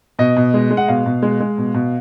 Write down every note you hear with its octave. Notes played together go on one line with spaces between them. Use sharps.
B2 D#5
B2
G#3
G#3
F#5
B2 F5
B2
G#3
G#3
B2
B2